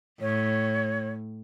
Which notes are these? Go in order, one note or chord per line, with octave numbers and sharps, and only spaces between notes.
A2 C#5